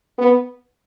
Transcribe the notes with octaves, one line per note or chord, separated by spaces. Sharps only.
B3